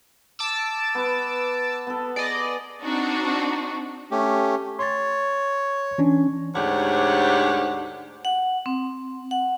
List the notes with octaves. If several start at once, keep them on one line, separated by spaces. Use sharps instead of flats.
A5 D6 E6
B3 B4
B3 A4
G#4 D5 D#5
C4 D4 D#4 F#4
A3 C#4 G4
C#5 C6 A6
E3 C#4 D4
D2 G#2 D4 G4 C#5 F#5
F#5
C4
F#5